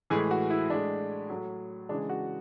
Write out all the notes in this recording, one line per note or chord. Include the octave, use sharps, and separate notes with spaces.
A2 E3 G#3 G#4
F#4
E4
A2 G#3 D4
A2 F#3
C#3 E3 G#3 D4
F#4